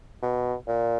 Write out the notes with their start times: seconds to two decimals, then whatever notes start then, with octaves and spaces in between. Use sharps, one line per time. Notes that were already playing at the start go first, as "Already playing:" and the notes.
0.23 B2
0.67 A#2